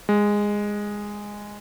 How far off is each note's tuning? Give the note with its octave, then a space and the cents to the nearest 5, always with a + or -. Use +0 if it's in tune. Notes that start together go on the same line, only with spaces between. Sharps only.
G#3 -10